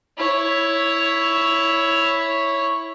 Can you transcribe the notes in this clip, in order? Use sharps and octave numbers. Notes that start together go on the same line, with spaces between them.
E4 C#5